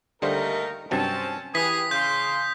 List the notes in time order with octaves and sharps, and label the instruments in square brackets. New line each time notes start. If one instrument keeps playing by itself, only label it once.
[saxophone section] D#2 A3 D#4 [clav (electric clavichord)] D3 G3 C5 [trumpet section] A#4
[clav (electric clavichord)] G2 C3 F#3 [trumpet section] C4 A5 [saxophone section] C#4
[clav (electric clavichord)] E3 [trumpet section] G4 B4 [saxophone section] G#4 [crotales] D#6 B6
[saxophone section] C#3 [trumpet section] C6 [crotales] G6